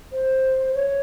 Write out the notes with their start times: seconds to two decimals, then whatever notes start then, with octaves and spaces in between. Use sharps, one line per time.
0.12 C5
0.74 C#5